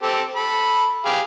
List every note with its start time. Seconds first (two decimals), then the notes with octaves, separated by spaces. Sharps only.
0.02 C4 G4 A4
0.36 A4 B5
1.05 G4 G#4 F5